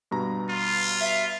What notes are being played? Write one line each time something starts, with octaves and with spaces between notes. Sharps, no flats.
G2 B2 A#5
F4
E5